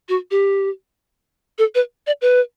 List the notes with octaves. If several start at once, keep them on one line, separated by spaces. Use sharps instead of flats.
F#4
G4
A4
B4
D5
B4